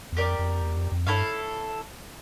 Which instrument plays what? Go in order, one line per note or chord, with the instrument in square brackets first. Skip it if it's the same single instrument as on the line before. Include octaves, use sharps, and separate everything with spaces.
[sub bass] E2
[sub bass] F2 [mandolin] G4 A#4 D5
[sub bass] F2
E2
F2
F2
[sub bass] G2 [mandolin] E4 A4 C#5 F5